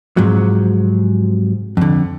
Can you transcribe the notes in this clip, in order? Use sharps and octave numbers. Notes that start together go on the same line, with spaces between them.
G#2 C3 F3 F#3
F2 D3